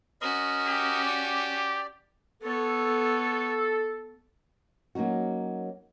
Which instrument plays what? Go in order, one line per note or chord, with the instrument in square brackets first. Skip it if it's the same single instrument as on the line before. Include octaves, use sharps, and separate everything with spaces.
[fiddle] C#4 F#4 [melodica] A#4 D#5
[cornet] G4
[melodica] D5
[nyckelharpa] B3 C#5 [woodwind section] A4
[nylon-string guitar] F#3 A#3 C#4 D#4 F#4